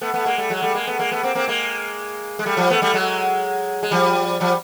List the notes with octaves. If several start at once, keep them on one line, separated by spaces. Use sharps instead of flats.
A3 B3
A3 B3
G#3 A#3
G3 A3
F#3 G#3
G3 A3
G#3 A#3
A3 B3
G#3 A#3
A3 B3
A#3 C4
A#3 C4
G#3 A#3
G#3
G3 A3
F3 G3
A3 B3
G3 A3
F#3 G#3
G#3
F3 G3
F3 G3